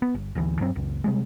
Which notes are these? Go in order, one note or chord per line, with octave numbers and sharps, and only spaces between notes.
B3
G1
D1 D2 D3 E3
E1 G2 F#3 C4
F#1 C#2
C3 G3 G#3